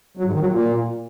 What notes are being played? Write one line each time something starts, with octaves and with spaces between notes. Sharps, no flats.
F#3
G#2
D#3
F#3
A#2